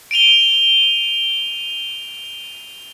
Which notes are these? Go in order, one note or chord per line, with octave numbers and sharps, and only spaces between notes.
D7 D#7 F7 G7